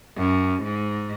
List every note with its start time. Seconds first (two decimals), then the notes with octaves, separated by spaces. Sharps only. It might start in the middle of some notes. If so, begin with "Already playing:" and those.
0.16 F#2
0.62 G#2